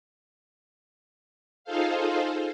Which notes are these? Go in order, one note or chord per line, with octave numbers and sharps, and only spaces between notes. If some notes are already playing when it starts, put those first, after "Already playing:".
D#4 F4 G#4 A4 C5 F5